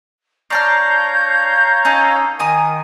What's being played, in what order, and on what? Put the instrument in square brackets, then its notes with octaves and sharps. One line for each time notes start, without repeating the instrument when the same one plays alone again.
[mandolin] D4 A5 F6 [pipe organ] C#5 F5 A#5 [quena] G6
[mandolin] C#4 D#4 A4
[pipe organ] D#3 [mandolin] G#5 A#5 D#6